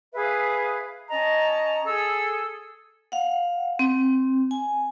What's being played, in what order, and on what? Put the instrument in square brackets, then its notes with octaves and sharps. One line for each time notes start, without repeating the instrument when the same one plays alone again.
[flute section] G#4 B4 E5 F5
C#4 D#5 A5 A#5
G#4 A4 E6
[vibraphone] F5 F#5
C4
G#5